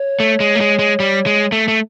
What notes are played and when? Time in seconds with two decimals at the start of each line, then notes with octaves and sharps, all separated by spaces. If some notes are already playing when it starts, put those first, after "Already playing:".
Already playing: C#5
0.20 A3
0.40 G#3
0.55 A3
0.60 G#3
0.79 G#3
1.00 G3
1.26 G#3
1.52 A3
1.68 A3